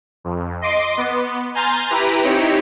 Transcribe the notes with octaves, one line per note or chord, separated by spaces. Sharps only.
F2
D#5 C6 D6
B3
G#5 A#5 C6 F6 G6 A6
E4 G4 B4 A#5
C4 D#4 E4 G4 C#5